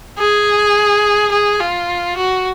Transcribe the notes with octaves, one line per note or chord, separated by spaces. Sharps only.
G#4
G#4
F4
F#4